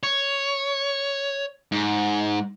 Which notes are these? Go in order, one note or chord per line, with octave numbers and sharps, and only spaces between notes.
C#5
G#2